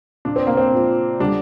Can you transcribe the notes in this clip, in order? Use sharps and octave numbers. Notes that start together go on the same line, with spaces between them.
A#2 F3 D4
C4
A#3
C4
A#2 F3
D3 G3 D4